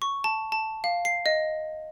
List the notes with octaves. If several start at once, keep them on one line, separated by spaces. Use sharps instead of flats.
C#6
A5
A5
F5
C7
D#5